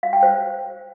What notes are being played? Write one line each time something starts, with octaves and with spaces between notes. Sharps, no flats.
F5
G5
C5